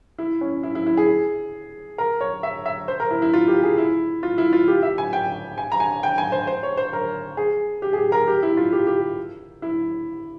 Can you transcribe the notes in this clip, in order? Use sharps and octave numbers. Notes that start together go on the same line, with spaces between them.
E4
C#4
E4
E4
E4
G#4
A#4
C#5
E5
E5
C5
A#4
E4
E4
F4
G4
G#4
E4
F4
E4
F4
G4
E5
G#5
G5
G#5
A#5
G#5
G5
G#5
C5
C5
C#5
C5
A#4
G#4
G4
G#4
G4
A#4
G4
E4
F4
G4
G4
E4